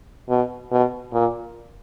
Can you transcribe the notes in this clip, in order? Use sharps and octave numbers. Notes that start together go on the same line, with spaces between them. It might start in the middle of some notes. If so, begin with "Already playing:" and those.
B2
B2
A#2